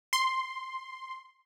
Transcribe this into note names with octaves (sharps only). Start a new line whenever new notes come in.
C6